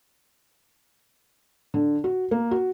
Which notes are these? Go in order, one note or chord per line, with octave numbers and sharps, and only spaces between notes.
D3
F#4
A#3
F#4